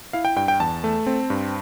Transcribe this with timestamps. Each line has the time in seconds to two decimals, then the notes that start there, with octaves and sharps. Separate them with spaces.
0.13 E4 F5
0.25 G5
0.36 G2 G5
0.48 G5
0.60 E2 A5
0.84 A3
1.06 C4
1.30 G2